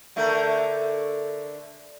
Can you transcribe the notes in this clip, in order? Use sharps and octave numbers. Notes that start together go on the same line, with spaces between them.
D3 A3 A#4